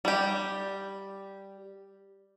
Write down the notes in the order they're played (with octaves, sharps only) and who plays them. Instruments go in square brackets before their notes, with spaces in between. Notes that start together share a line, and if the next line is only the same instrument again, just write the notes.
[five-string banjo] G3 G4